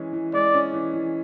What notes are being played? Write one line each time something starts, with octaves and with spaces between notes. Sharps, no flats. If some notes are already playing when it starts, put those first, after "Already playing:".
Already playing: E3 G#3 C#4
E3
G#3 D5
C#4
E3
E3